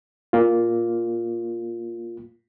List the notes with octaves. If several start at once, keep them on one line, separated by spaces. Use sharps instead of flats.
A#3 F4